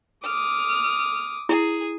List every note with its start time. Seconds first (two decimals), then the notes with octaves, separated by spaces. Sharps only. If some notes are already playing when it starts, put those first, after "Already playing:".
0.25 D6 D#6 F6
1.49 E4 G#4